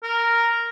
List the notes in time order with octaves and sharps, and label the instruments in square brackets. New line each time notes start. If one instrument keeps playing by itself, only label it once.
[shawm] A#4